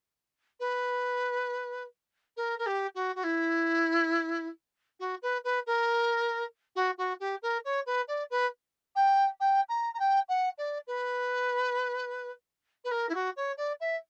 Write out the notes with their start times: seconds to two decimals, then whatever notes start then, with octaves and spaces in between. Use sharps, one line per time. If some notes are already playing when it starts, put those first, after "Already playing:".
0.60 B4
2.37 A#4
2.59 A#4
2.66 G4
2.95 F#4
3.15 F#4
3.24 E4
5.00 F#4
5.22 B4
5.44 B4
5.66 A#4
6.76 F#4
6.98 F#4
7.20 G4
7.42 A#4
7.65 C#5
7.86 B4
8.08 D5
8.30 B4
8.95 G5
9.40 G5
9.69 A#5
9.94 A#5
9.99 G5
10.29 F#5
10.58 D5
10.87 B4
12.84 B4
12.91 A#4
13.09 E4
13.14 F#4
13.36 C#5
13.57 D5
13.80 E5